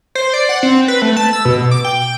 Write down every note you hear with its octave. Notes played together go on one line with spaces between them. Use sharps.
C5
D5
F#5
C4
B4
A3
A5
E6
B2
D6
G5